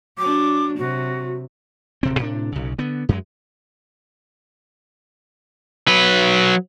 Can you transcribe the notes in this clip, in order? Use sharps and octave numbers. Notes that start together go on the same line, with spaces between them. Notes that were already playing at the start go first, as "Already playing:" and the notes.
F#3 D4 D6
C3 F#3 F#4
D1 C3 C4
A2 C3 D4
B1 C#3
D3 B3
F#2 F#3 G#3
F#3 B4